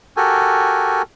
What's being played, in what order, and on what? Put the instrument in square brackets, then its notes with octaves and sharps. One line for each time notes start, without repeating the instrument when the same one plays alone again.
[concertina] F#4 G4 A4 A#4 G#5